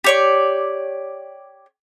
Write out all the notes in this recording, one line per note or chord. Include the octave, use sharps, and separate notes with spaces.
G4 C#5 D5